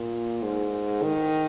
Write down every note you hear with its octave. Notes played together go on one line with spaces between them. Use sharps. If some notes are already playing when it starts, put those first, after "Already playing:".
Already playing: A#2
G#2
D#3